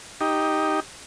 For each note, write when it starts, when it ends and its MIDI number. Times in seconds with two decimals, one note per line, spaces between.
0.21 0.80 63
0.21 0.80 67